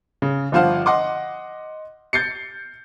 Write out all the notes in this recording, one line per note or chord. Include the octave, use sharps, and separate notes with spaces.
C#3
G1 F3 F4 C5 F5 F#5
D#5 F#5 C6 D6
G6 A6 C7 C#7